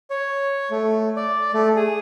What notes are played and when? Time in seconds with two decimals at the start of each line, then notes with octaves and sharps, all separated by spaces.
0.10 C#5
0.71 A3
1.16 D5
1.54 A3
1.76 G#4